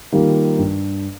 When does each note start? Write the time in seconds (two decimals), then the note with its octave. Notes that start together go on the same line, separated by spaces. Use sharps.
0.12 D#3 G3 A#3 F4
0.58 G2